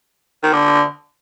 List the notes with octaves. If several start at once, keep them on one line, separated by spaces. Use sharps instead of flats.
D#3
D3